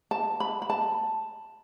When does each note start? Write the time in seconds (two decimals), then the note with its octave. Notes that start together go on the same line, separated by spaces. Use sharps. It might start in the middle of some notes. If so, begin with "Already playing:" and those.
0.11 A5
0.40 B5
0.62 B5
0.70 A5